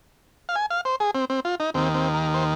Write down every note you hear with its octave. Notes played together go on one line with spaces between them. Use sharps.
F5
G#5
F5
C5
G#4
C4
C4
F4
D#4
D#2 D#3 C4
C4
A#4
C5